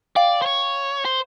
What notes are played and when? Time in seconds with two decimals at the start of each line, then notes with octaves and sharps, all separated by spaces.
0.16 D5 F5 G5
0.42 C5
0.46 C#5
1.05 C5